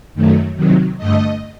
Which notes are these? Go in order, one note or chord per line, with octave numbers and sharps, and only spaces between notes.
F#2 D#3 F#3 A3
C3 D#3 F#3
G2 D3 A3 D#5